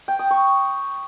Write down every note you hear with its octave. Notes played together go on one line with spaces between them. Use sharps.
G5
D#6
C#6